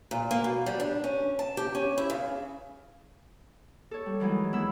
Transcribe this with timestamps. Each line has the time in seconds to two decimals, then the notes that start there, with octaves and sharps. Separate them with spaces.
0.11 A#2
0.31 A#3
0.44 B2
0.66 G3
0.80 D4
1.04 C#4
1.39 A5
1.57 G4
1.75 C#4
1.98 E4
2.10 C#3
3.91 A4 C#5
4.06 G3
4.20 D#3 E3 F#3 G#3
4.53 E2 E5 B5 E6